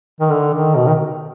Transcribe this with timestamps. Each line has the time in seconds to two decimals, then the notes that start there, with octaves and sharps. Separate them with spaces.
0.20 D#3
0.31 D3
0.54 D#3
0.75 B2
0.87 D#3